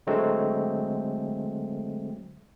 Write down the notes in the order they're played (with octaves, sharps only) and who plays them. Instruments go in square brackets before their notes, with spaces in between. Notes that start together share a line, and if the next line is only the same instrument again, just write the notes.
[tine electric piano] D3 F#3 G#3 A3 C4